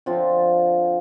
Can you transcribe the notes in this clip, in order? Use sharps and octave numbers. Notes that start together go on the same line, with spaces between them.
D3 F3 C4 F4